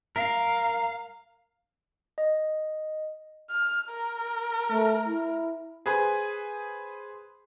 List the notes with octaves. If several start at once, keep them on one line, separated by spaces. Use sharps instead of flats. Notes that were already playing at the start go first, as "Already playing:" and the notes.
A#4 F5
D#5
F6
A#4
A3
E4
G#4 B4 C5 G#5